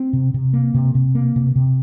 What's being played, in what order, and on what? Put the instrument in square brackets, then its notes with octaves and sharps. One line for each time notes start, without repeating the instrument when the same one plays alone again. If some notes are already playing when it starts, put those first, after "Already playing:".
Already playing: [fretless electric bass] C4
C3
C3
A#3
C3
C3
A#3
C3
C3